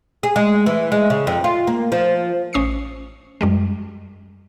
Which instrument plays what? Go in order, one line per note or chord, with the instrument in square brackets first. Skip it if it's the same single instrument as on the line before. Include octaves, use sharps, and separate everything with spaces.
[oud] G#4
G#3
E3
G#3
C#3
F2
F4
A#3
F3
[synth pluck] A1 C#4 D#6 C7 C#7
F#2 G3 G#3